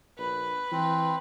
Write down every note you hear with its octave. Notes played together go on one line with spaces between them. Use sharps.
A#1 B4
E3 C4